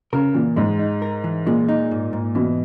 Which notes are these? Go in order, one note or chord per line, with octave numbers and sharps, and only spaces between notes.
C#3 A#4
A#2 E3
G#2 G#3
D#4
A#4
E3
A#2 G#3
D#4
G#2
G#2
B2 E3